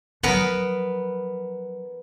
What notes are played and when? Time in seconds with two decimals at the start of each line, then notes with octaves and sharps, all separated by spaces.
0.23 F3 F#3 B3 A#4